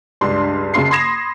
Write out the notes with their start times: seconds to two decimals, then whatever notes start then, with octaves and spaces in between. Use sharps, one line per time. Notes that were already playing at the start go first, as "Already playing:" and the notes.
0.21 C#2 G2 D4 C6
0.74 F#1 C#3 A#3 C6 C7
0.90 B5 C6 D#6 G#6 A#6 E7